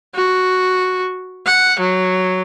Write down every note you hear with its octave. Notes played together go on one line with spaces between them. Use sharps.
F#4
F#5
F#3